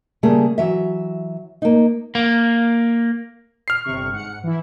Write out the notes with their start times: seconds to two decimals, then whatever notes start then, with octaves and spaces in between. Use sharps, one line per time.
0.23 C#3 G3 A3 A#3 G#4
0.58 E3 F#3 E5
1.62 A#3 D#4
2.15 A#3
3.68 F6 C7
3.84 G1 C3 C#6
4.13 G#2 F#5 C#7
4.44 E3 E4